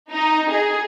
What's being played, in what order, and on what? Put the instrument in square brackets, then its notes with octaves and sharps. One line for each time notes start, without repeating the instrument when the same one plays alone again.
[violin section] D#4
G#4